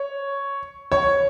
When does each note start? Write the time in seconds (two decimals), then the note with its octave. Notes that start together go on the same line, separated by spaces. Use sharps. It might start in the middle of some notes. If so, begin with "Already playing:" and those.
Already playing: C#5
0.92 C#5